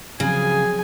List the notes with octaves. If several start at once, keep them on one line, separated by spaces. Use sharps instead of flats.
C#3 F3 F#3 C4 G#4 G#5